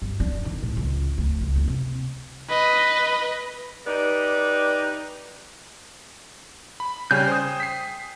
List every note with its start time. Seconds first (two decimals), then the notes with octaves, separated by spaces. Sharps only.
0.02 G1
0.20 D4
0.45 D#3
0.63 A2
0.77 C#2
1.18 D2
1.41 C#2
1.56 F#1
1.68 C3
2.49 B4 D#5
3.87 D#4 G4 B4 D5
6.80 B5
7.11 C#3 G3 C#4 G5 G#5 G6
7.28 C5 D#6
7.60 B6 C7